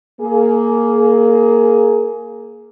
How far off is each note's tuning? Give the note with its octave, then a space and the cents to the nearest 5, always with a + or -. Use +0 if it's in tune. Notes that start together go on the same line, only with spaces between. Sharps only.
A#3 +0 G#4 +20